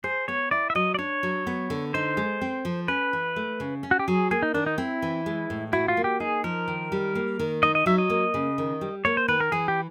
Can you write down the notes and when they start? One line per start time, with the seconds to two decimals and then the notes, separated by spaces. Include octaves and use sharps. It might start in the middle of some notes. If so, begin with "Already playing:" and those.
0.04 G#4 C5
0.28 B3 C#5
0.51 E4 D5
0.70 E5
0.75 F#3 D#5
0.94 D5
0.99 D4 C#5
1.23 F#3
1.47 B3
1.70 D3
1.94 D#4 C5
2.17 G#3
2.41 C4
2.65 F3
2.88 C#4 B4
3.13 E3
3.36 A3
3.60 C#3
3.83 C#4
3.91 F#4
3.99 G4
4.08 F#3 G#4
4.31 A#3 G#4
4.43 D#4
4.54 D#3 D4
4.66 D#4
4.78 C4 E4
5.02 E3
5.26 G#3
5.50 A2
5.73 E4 F#4
5.88 F4
5.97 A#3
6.04 G4
6.20 D#4 G#4
6.44 F3 A#4
6.68 D#3
6.92 G3
7.15 A#3
7.39 D#3
7.63 D#4 D#5
7.75 D#5
7.86 F#3 E5
7.98 D#5
8.10 A#3
8.34 C#3
8.58 D#3
8.81 G3
9.05 A#3 C#5
9.17 C5
9.28 D#3 B4
9.40 A#4
9.52 E3 G#4
9.68 G4